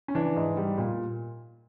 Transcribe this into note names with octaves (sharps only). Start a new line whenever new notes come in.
C#4
E3 D4
G#2
G3
A#2